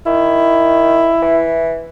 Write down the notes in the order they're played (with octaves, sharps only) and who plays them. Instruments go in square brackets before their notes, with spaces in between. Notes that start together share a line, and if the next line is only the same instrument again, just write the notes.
[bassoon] D#3 [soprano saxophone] E4
[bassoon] E3